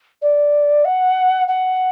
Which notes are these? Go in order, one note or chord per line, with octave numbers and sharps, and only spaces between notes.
D5
F#5
F#5